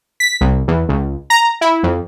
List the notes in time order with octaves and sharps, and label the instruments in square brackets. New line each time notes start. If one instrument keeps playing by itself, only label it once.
[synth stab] B6
C2
E2
C#2
A#5
E4
F2